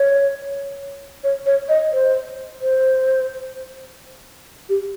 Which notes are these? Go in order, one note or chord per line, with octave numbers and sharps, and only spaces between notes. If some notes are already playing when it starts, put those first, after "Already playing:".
Already playing: C#5
C#5
C#5
D#5
C5
C5
G4